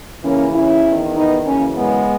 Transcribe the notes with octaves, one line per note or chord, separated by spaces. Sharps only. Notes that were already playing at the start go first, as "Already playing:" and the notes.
D#2 C#3 E3 A#3 C#4
C#4 E4
E2 D#3
B3 D#4
F#2 C#3 E3 A#3 C#4
G#3 B3